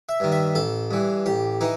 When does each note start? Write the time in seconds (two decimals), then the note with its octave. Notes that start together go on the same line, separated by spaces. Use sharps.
0.09 E5
0.20 G2 D#3
0.32 E5
0.55 A1 A4
0.91 G2 E3
1.26 A1 G4
1.61 E3 D#4